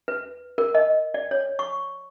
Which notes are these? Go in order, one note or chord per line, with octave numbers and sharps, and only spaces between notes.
B4
A#4
D#5
D5
C#5
C#6